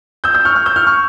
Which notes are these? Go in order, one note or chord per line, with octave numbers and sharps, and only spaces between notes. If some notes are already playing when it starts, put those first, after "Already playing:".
E6 G6
E6 G6
C#6 F6
C#6 F6
E6 G6
C#6 F6
C#6 F6